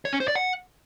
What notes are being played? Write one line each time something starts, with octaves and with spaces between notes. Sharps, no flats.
C#5
C#4
C5
D5
F#5